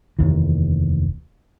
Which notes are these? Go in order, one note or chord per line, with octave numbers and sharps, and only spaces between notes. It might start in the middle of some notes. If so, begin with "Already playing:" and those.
F1 D#2 E3